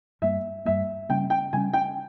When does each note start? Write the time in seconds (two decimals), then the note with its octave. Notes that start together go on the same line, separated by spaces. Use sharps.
0.22 G2 G3 A#3 E5
0.65 G2 G3 A#3 E5
1.09 C#3 G3 A#3 C#4 G5
1.30 G5
1.53 C#3 G3 A#3 C#4 G#5
1.73 G5